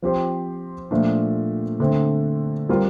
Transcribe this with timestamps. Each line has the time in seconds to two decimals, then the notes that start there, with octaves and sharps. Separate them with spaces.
0.02 F3 C4 G4 C5
0.91 A#2 F3 A3 D4
1.80 D3 A3 C4
2.69 G3 C4 F4 A#4